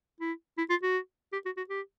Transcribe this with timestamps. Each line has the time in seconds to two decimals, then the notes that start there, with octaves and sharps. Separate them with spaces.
0.21 E4
0.58 E4
0.70 F4
0.83 F#4
1.32 G4
1.45 F#4
1.57 F#4
1.69 G4